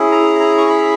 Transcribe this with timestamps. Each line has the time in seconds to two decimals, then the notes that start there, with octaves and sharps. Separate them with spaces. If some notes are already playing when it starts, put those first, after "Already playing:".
Already playing: C#4 E4 G#4
0.12 A#5
0.40 A#5
0.58 C#6
0.69 B5